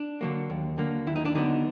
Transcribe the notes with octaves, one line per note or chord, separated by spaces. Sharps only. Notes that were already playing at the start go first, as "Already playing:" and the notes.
Already playing: D4
D3 F#3 A#3
D#2
D3 F#3 A#3
D#2 E4
D#4
D4
D3 F#3 B3 D#4